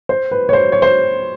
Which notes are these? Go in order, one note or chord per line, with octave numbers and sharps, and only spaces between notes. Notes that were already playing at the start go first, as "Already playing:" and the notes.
C5
B4
C#5
C5
C#5
C5